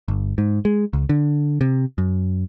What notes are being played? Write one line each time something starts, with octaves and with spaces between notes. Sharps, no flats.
G1
G#2
G#3
C#2
D3
C3
F#2